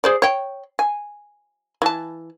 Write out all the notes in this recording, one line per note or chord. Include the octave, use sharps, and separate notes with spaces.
G#4 C5 D5
C#5 G5
G#5
E3 A5